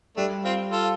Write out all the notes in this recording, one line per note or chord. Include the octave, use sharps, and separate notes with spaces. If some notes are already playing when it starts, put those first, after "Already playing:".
G3 A3 D4
C4 F4
F4 A4